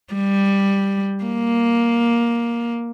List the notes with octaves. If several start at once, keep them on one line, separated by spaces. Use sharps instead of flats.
G3
A#3